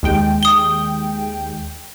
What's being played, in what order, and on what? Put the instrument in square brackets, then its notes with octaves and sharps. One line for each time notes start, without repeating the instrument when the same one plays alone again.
[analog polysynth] D#2 G#3 G5
[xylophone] D#6 G7